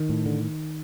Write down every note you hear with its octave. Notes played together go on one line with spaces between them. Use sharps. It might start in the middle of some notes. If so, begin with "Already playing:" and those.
Already playing: D#3
A2
D3